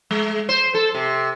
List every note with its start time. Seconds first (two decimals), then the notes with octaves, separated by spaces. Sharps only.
0.11 G#3
0.49 C5
0.75 A4
0.94 C3